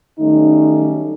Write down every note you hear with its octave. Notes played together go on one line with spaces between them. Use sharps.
D#3 F#3 G3 A3 C#4 D#4